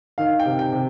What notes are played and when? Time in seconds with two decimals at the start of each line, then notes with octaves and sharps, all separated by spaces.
0.18 D#3 F5
0.40 G5
0.45 C3
0.59 G5
0.73 C3